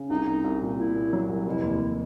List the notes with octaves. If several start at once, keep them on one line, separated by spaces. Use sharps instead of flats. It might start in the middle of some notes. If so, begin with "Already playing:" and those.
Already playing: C#3
C2 D#4
C2
C2
A#2
A#2 E4
A#2
F#3
C2
F1 E4
D#2
F1